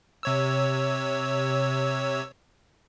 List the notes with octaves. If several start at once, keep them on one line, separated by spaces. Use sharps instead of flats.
C3 C#5 E6